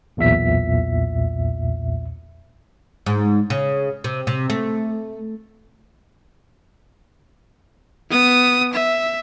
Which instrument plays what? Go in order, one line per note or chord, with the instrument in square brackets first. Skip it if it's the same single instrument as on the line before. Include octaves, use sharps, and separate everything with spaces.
[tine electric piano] B1 E2 A#2 E5 B6
[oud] G#2
C#3
C3
C3
A3
[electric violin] B3 D#6
E5